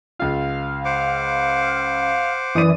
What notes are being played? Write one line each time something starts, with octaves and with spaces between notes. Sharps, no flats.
C#2 F4 F5
C5 F#5 D6
F#2 E3 D5 D#6 D#7